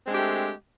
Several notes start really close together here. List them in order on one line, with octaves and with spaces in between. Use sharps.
C4 G#3 D4 G4 A3